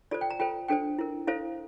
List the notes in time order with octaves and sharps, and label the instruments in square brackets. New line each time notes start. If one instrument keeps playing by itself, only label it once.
[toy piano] F4 A4 C5 D5
G5
A#5
F4 A4 C5 G5
D4 A4 C5 G5
E4 A#4
E4 A4 C5 F5